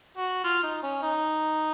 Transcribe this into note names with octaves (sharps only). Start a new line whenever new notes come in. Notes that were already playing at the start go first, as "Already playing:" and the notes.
F#4
F4
D#4
C#4
D#4